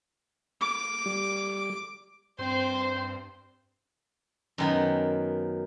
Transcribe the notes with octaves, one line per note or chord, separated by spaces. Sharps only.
D6
G3
G2 C4 C5
F#2 D#3 B3